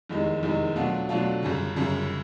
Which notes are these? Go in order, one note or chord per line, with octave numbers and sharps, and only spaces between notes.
F1 E2 C3 D#3 G#3
F1 E2 C3 D#3 G#3
B2 F#3 A3 D4 F4
B2 F#3 A3 D4 F4
G1 F#2 C#3
G1 F#2 C#3